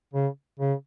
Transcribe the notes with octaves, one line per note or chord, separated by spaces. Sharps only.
C#3
C#3